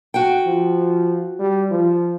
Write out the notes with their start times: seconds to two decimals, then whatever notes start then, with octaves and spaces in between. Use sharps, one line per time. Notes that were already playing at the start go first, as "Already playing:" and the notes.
0.14 F#4 G5
0.46 F3
1.39 G3
1.71 F3